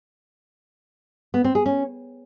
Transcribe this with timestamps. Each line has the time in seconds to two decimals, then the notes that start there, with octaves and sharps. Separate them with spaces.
1.34 B3
1.44 C4
1.55 G#4
1.66 C#4